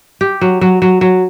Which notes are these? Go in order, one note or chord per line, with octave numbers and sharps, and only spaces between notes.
G4
F#3
F#3
F#3
F#3